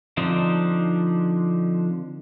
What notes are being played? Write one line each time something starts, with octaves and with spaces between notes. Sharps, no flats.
D3 F3 C4 D4 D#4